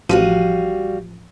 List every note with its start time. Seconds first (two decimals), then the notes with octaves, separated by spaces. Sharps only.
0.09 A1 F3 G3 F#4 F5 D#7